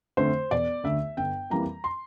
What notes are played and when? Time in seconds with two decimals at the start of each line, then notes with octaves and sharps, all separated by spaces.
0.17 F2 D3 A3 C5
0.51 E1 D5
0.83 D2 D3 A3 E5
1.17 G1 G5
1.50 F2 E3 G3 A#3 A#5
1.84 C6